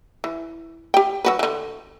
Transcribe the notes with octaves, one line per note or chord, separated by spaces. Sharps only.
E3
G4 G5
F#3 F#4 B4
D3 E3